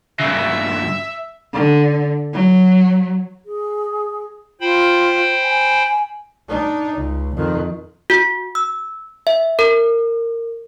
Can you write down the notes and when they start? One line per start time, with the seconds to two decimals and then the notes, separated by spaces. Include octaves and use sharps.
0.20 G2 C#3 E5
1.53 D3
2.33 F#3
3.46 G#4
4.60 F4 C5 G5 B5
5.44 G#5
6.49 D4 D#4
6.97 C#2
7.35 F2 D#3
8.10 F#4
8.55 E6
9.27 E5
9.59 A#4